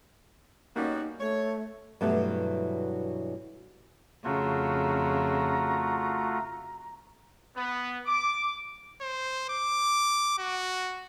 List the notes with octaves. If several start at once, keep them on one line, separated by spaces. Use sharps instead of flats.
B2 G3 A#3 C#4 D#4 F#4
A3 C#5
G2 B2 E3 F#3 A3 B3
F2 C#3 A3 F4 F#4 A#5
B3
D6
C5
D6
F#4